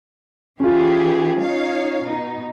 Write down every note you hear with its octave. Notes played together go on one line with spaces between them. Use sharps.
E3 C#4 F4 G4 G#4
D#4 C#5 F5
B2 D#4